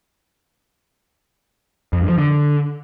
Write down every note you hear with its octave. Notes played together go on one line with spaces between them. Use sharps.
F2
G2
F3
D3